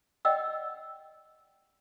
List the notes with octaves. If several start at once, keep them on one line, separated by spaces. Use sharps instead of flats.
D5 D#5 F#5 G5 E6